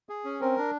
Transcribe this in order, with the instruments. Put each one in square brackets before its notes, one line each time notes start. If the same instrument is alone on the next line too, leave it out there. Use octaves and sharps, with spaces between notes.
[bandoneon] G#4
C#4
[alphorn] C4 [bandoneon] A#4
[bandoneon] D4